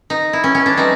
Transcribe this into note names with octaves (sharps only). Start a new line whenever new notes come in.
D#4
E4
C#4
C#4
D4
E3 G3 C4 D#4